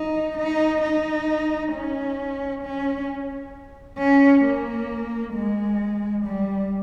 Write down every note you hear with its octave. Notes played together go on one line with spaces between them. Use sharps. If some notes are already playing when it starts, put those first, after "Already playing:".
Already playing: D#4
D#4
D#4
C#4
C#4
C#4
A#3
G#3
G3